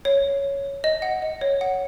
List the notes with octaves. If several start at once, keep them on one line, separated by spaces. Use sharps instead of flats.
C#5
D#5
F#5
D#5
C#5
F#5